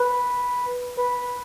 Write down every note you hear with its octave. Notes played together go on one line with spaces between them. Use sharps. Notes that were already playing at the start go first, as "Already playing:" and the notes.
Already playing: B4
B4